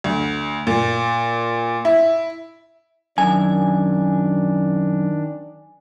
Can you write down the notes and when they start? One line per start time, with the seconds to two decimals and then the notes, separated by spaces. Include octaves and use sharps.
0.04 D2
0.67 A#2
1.85 E4
3.18 F#2 D#3 D4 G#5